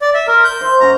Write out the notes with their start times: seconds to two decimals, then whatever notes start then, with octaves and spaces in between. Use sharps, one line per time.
0.02 D5
0.14 E5
0.28 A#4 C6
0.44 G6
0.61 C5 E5
0.80 F#2 C#4 F#5 A#5